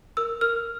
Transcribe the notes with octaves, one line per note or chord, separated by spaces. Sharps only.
A#4 E6
A#4 F6